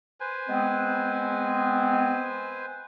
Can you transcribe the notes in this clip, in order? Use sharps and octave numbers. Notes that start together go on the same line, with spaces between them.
B4 C5 G#5
G#3 B3 C4